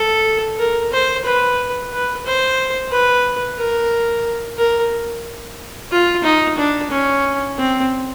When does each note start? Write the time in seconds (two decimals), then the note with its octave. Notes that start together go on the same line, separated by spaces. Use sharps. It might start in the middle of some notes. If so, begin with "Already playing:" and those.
Already playing: A4
0.58 A#4
0.92 C5
1.25 B4
1.92 B4
2.25 C5
2.91 B4
3.58 A#4
4.57 A#4
5.91 F4
6.24 D#4
6.57 D4
6.90 C#4
7.58 C4